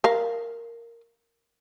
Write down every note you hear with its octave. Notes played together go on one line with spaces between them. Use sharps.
A#4 F5